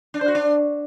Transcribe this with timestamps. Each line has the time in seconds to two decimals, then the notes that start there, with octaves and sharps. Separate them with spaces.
0.14 D4
0.21 C5
0.28 F#4
0.35 D4